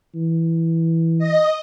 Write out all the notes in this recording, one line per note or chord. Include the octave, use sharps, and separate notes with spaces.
E3
D#5